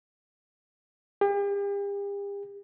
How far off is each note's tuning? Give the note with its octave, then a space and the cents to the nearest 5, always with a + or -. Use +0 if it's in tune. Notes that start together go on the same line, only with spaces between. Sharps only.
G4 +40